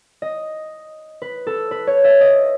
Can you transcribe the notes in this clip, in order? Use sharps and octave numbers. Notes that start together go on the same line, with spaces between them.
D#5
B4
A4
B4
C#5
E5
D#5